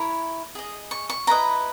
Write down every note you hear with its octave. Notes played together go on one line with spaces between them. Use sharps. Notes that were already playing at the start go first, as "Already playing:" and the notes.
Already playing: E4 A#4 C#5
G#4 D#5
C#6
C#6
E4 B4 D#5 A#5